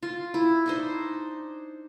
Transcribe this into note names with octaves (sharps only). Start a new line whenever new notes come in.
F4
E4
D4 D#4 C5